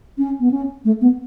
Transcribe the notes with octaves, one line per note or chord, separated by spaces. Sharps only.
C#4
B3
C#4
A3
B3